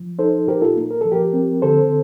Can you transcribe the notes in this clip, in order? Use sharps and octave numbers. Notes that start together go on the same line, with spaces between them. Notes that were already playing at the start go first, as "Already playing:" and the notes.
Already playing: F3
D#4 A4 C5
A#2 G4 A#4
F4 A4
A#3
A#4
F3 A4
G4 A#4
C4
D3 A4 C5